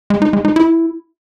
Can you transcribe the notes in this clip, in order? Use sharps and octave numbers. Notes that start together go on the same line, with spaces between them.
G#3
D#4
G#3
D#4
E4